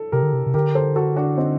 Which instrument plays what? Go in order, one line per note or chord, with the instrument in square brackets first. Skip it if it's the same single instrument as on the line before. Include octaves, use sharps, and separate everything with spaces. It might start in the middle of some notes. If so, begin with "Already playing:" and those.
Already playing: [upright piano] A4
[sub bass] C3 [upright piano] G4 A#4
[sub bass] D3
C3
C3
[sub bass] D3 [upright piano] G4 A#4
[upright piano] A4 C5
F#4 A4
D4 F#4
C4 D#4